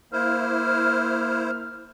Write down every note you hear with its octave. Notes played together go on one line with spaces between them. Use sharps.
A#3 E4 C5 F6